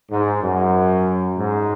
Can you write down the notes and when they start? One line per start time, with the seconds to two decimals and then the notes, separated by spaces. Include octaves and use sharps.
0.11 G#2
0.42 F#2
1.38 G#2